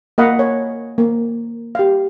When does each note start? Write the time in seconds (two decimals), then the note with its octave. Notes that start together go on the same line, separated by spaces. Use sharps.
0.18 A#3 D#5 F5 F#5 B5
0.39 C#5
0.98 A#3
1.75 G4 F5